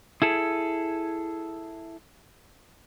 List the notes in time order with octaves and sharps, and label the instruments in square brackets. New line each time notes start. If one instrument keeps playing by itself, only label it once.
[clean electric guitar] E4 G#4 A4